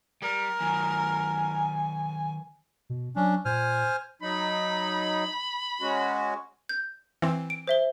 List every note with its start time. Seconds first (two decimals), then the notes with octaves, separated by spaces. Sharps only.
0.22 G3 A#4
0.60 D#3 F#3 G#5
2.90 B2
3.16 F#3 C#4 D4
3.45 A#2 C5 G#5 F6
4.22 F#3 D#4 B5
5.81 G#3 C#4 F#4
6.69 G6
7.22 E3 C4
7.50 D7
7.67 C5 E5 G7